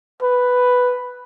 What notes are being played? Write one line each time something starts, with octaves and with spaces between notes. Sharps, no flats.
B4